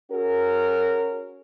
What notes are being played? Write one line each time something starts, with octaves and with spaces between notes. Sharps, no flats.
C#4 F#4 G#4 A#4